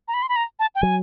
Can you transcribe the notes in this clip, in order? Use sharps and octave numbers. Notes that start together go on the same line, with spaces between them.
A#5
B5
C6
B5
A#5
A5
G5
F#3 G#5